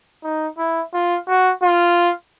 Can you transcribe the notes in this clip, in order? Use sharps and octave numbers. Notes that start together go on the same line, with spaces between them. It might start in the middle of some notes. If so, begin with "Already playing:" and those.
D#4
E4
F4
F#4
F4